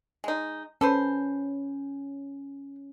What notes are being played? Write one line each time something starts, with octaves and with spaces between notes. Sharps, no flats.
G#3 D#4
C#4 A4 B4 C5